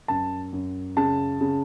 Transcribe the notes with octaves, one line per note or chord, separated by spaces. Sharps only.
F#2 A5
F#2
C#3 A5
C#3